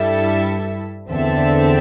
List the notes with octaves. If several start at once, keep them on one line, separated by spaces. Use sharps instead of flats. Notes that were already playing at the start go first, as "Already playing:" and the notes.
Already playing: G2 G3 E4 A4 E5
E2 D3 C4 A4 E5